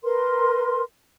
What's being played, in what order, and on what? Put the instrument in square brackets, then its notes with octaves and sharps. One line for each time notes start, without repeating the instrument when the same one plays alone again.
[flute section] A#4 B4 C6